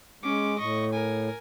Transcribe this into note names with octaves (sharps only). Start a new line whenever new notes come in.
G#3 C#4 D6
A2 D#5 C#6
A#4 G#5